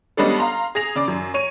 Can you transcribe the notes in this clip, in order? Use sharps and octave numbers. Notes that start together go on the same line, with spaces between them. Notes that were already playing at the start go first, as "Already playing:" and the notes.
G3 G#3 B3 C#4 D4 A4
F5 A#5 C6
G#4 A#6 F7
C#3 D5 D6
F#2
C#5 D#7